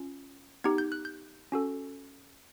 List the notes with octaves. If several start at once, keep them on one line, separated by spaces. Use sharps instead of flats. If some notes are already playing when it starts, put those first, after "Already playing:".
Already playing: C#4 F4
B3 D#4 G4 G#6
G6
F#6
G6
C#4 F#4 A4